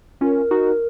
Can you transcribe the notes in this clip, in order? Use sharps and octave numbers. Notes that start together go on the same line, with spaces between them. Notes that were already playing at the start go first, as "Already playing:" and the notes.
C#4 F4 A#4
D#4 F#4